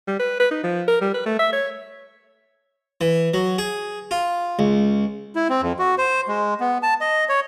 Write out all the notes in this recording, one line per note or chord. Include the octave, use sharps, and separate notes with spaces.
G3
B4
B4
D#4
F3
A#4
G3
B4
A3
E5
C#5
E3
F#3
G#4
F4
C#2
E4
C4
F2
F#4
C5
G#3
B3
A5
D#5
C#5